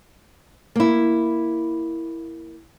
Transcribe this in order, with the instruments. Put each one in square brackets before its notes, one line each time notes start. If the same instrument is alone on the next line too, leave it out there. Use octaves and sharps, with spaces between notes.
[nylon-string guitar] A#3 E4